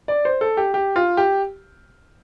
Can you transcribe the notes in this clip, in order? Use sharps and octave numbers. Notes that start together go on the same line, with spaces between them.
D5
C5
A4
G4
G4
F4
G4